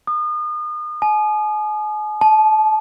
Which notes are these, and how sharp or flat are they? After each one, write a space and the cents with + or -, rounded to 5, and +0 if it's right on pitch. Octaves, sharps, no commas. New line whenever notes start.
D#6 -35
G#5 +40
A5 -30